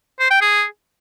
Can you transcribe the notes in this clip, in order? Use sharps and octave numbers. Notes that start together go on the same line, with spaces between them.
C5
G5
G#4